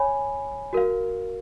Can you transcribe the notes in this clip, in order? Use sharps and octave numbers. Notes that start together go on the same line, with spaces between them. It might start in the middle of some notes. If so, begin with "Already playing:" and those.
Already playing: C#5 G#5 B5
F#4 A#4 F5